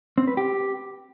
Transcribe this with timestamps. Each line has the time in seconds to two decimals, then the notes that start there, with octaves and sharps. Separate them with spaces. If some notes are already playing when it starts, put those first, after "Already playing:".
0.18 C4
0.27 B4
0.37 G4